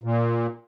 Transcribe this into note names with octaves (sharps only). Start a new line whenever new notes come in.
A#2